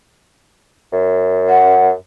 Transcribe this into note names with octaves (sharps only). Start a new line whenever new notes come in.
F#2
F#5